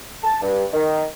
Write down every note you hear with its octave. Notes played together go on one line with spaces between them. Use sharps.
A5
G2
D#3